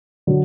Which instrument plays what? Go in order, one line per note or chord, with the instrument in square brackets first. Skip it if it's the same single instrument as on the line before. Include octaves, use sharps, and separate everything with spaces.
[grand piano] D3 F#3